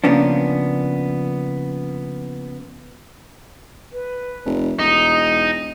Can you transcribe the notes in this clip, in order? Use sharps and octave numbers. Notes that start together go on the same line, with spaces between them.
C#3 F3 A#3 B3 C#4 D4
B4
F1
E1 D#4 D#6